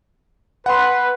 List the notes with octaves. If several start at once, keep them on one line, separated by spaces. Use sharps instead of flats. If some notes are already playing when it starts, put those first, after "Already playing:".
B4 F#5 C6